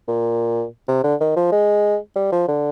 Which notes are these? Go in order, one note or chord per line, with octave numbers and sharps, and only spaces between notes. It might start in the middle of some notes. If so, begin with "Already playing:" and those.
A#2
C3
D3
D#3
F3
G#3
G3
F3
D3